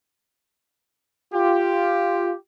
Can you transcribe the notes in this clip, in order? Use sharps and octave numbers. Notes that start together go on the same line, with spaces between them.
F4 G4